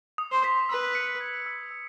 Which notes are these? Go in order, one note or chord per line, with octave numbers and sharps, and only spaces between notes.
D#6
C5
B6
B4 E6
C#7
G#6
E6
E6